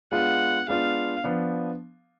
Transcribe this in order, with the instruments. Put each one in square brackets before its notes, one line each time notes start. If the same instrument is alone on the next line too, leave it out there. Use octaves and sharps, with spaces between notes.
[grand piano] G#3 B3 D4 F4 [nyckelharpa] F#5
[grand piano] G#3 B3 D4 F4 [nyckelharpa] F5
[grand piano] F3 B3 D4